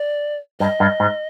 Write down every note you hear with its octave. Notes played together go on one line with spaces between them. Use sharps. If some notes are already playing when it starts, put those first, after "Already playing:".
Already playing: D5
G2 D#5
G2
G#2